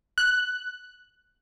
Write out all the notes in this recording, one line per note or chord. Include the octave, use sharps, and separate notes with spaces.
F#6